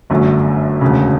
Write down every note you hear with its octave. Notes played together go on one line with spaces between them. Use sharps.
G1 F#2 D3 A3
E1 D2 C#3